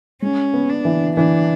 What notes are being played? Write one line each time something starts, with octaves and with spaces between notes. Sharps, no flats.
G#3 C#4
B3
D4
E3
E3 D4